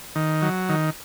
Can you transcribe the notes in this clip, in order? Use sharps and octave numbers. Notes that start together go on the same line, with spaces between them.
D#3
F#3
D#3